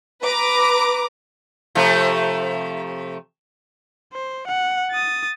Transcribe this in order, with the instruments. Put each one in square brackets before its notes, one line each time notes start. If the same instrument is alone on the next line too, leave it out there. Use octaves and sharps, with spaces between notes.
[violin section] B4 A#5 D6
[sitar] C3 F3 A3
[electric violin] C5
F#5
D#6 A6